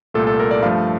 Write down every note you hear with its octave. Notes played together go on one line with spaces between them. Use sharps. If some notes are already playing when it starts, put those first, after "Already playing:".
C2 A#2 A3 A4
A4
A#4
D5
G2 F3 A3 F5